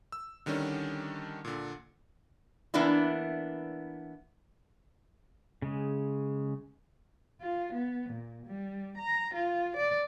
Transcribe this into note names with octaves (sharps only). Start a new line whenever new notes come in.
E6
D3 D#3 G3 C#4 D4
A#2 D3
E3 A#3 B3 D4 E4
C#3 G#3
F4
B3
A#2
G3
A#5
F4
D5